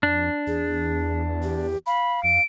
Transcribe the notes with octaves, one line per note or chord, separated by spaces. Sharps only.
F2 D4
E2 G#4
G4
F5 B5
F2 D7